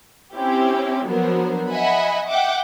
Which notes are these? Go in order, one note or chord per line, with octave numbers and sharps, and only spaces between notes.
C4 C#4 E4 G4
F3 F#3 B3 D4 A#4 C5
D#5 E5 F#5 G#5 B5
E5 F#5 G5 D6